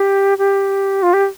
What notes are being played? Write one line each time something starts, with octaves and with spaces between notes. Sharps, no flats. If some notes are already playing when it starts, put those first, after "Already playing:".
Already playing: G4
G4
F4
G4